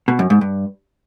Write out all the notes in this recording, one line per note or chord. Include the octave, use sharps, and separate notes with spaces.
B2
F#2
G#2
G2